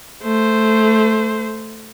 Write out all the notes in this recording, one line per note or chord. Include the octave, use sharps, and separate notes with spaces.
A3 C5